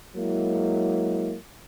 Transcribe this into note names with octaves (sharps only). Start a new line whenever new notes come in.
F#3 G#3 A#3 E4